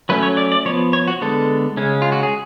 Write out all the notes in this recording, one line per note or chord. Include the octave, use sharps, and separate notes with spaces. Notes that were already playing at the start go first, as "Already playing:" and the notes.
F#3 A3 C#4 B4
C#5
D5
D5
F3 B3 C#5
C#5
F#4
D3 G#3 B3 A4
C#3 G#3 C#4
F4
F#4
G#4